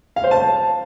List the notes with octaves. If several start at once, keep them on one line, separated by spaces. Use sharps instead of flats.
F5
C5
A5